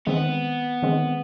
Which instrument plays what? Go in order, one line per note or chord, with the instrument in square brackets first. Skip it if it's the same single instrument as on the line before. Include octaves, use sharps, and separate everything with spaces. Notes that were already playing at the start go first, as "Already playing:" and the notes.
[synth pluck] D#3 G#3 C4 [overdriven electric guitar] B3
[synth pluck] D#3 G#3 C4